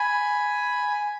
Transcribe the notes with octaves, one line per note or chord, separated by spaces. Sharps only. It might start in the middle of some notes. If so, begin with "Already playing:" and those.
Already playing: G#5 B5